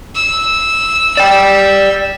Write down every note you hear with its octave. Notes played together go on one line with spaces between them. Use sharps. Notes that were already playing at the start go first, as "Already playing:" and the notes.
E6
D5 G5